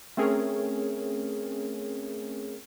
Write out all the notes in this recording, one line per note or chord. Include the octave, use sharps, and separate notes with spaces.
A3 C4 C#4 G#4 A#4 C#5